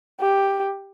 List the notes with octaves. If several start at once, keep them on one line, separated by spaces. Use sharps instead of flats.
G4